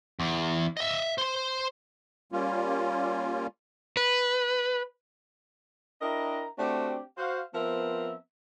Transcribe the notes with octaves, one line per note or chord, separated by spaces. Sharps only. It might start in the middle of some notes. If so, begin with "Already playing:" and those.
E2
D#5 E5
C5 C6
G3 A#3 C#4 F4
B4
D4 E4 A#4 D#5 G5 A#5
A3 C4 D4 F#4 G4
F#4 C5 F5
F3 B3 C4 A#4 E5